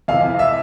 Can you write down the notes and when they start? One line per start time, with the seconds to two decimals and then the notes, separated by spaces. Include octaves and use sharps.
0.08 F2 C3 E3 F5
0.39 E5